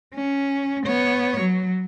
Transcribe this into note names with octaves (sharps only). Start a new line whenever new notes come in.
C#4
B3 C#5
F#3